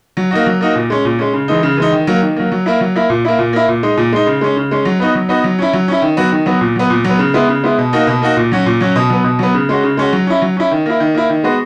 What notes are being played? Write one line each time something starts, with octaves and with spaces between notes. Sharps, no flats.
F#3
A#3 D#4 F#4
F#3
A#3 D#4 F#4
A#2
G#3 C#4
A#2
G#3 C#4
C#3
E3 G#3 D#4
C#3
E3 G#3 D#4
D#3
F#3 A#3
D#3
F#3 A#3
F#3
A#3 E4
F#3
A#3 E4
A#2
A#3 E4
A#2
A#3 E4
A#2
G#3 D#4
A#2
G#3 D#4
C#3
G#3 C#4
C#3
G#3 C#4
F#3
B3 D#4 F#4
F#3
B3 D#4 F#4
F#3
C#4 E4
F#3
C#4 E4
D#3
F#3 B3 F#4
D#3
F#3 B3 F#4
A#2
F#3 B3
A#2
F#3 B3
C#3
G#3 B3 E4
C#3
G#3 B3 E4
B2
A#3 D#4 F#4
B2
A#3 D#4 F#4
A#2
F#3 C#4 F#4
A#2
F#3 C#4 F#4
B2
F#3 B3
B2
F#3 B3
C#3
G#3 C#4 F#4
C#3
G#3 C#4 F#4
F#3
C#4 E4
F#3
C#4 E4
D#3
A#3 E4
D#3
A#3 E4
D#3
G#3 B3 F#4